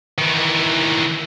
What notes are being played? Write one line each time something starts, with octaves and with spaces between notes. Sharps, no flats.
D#3 E3